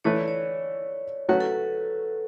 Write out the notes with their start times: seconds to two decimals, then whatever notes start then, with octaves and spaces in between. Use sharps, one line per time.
0.04 E3 A3 E4 B4 C#5
0.16 D5
0.28 C#5
1.29 F#3 A3 C#4 F#4 B4
1.40 A4